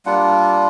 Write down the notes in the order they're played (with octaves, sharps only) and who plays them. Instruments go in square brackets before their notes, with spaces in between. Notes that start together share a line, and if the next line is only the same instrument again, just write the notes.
[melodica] G3 A#3 D4 F4 F#5